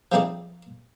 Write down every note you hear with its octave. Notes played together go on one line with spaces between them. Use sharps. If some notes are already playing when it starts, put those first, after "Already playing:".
F3 G3 C4 D#4 G#4 D5